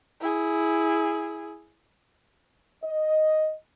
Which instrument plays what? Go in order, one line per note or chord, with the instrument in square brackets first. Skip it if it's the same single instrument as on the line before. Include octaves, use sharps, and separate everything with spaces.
[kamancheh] E4 G#4
[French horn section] D#5